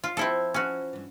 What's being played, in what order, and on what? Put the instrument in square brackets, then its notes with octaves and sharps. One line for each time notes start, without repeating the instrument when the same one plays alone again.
[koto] F4 [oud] C#5
[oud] F3 [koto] C4 E4 A4
[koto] C#4 F#4
[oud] G2 E3